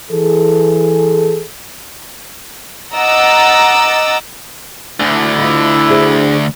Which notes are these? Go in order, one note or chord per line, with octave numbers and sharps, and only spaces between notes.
E3 G#4 A4
D#5 F#5 A#5 D6 E6 A6
D2 D3 E4 G#5
F4 D#5
D4 G#4 C5